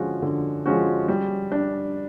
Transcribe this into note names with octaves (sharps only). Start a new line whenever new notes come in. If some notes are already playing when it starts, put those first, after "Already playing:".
Already playing: D3 F3 G#3 C#4 F#4
D3
F3 G#3 C#4 F#4
G3
D4